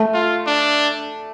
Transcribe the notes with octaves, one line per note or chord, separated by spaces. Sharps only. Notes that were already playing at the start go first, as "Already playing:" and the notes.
Already playing: A3
F4
D4